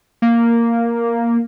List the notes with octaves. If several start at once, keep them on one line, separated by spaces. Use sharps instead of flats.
A#3